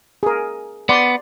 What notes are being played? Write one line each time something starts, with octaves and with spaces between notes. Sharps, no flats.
G#4 A#4
B3 D5 C6